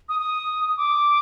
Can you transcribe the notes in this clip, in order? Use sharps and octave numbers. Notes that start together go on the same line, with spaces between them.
D#6
D#6
D6